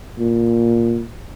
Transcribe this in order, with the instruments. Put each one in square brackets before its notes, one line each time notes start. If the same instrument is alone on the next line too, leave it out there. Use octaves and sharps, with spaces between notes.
[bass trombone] A#2